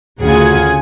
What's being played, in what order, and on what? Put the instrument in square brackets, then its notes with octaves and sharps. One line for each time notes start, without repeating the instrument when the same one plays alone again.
[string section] D2 C#3 F4 G#4 F#5 G#5